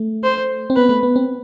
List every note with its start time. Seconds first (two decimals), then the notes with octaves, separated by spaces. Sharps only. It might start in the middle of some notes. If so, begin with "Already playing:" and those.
Already playing: A3
0.24 C5
0.70 C4
0.76 B3 B4
0.89 A3
1.03 B3
1.16 C4